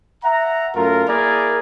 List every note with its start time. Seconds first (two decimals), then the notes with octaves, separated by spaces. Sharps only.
0.23 E5 F#5 A#5
0.75 F#2 A3 F4 A#4
1.07 A#3 E4 G#4 A#4 D5